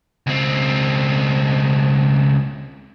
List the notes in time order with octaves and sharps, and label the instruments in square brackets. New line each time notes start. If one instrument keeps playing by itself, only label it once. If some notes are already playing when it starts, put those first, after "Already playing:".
[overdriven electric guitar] C#2 C4